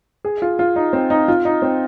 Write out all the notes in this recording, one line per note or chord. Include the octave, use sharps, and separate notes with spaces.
G#4
F4
F4
D#4
C4
D#4
F4
D#4
C4